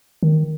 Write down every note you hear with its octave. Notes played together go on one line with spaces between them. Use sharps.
D#3